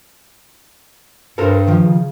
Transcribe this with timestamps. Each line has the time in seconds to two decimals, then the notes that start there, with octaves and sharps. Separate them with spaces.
1.38 G2 A4 A#4 C5
1.67 D#3 F3
1.83 C#3